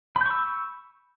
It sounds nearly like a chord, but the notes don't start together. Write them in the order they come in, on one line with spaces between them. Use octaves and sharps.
B5 G6 C#6 E6